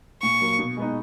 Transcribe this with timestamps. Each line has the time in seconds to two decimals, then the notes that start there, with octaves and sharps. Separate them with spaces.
0.22 A#2 C#6
0.41 F#3 A#3
0.59 B2
0.77 G#3 B3 D#4